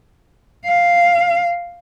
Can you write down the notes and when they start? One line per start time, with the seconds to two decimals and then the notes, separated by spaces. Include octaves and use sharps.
0.66 F5